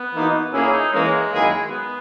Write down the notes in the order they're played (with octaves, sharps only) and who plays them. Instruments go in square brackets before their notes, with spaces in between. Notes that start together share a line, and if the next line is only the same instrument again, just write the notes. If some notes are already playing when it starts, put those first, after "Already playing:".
Already playing: [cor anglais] B3
[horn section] E3 A#3 D#4 F#4 B4
[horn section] A#2 A#3 C#4 G#4 [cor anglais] E4
[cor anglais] D#4
[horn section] E3 A#3 C#4 G#4 [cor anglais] G#3
[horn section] F#2 D#3 A#3 E4 G#4
[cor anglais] B3